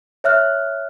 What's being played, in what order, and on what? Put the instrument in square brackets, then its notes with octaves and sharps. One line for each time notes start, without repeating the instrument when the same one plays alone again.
[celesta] C#5 E5 F6 F#6